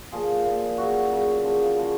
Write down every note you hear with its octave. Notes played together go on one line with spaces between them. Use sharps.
A#2 F3 G#4
A#2 F3
C#3 F#3 F#4
C#3 F#3
C#3 F3
C#3 F3